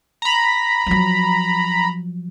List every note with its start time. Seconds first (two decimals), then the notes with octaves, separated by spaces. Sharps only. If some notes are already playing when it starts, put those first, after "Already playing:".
0.22 A#5 B5
0.87 F3 F#3